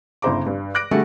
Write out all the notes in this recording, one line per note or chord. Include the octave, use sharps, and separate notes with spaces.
G1 C#3 E4 C5 A#5 D6
G2
D6 F#6 A#6 D7
D3 G3 A3 F#4 G#4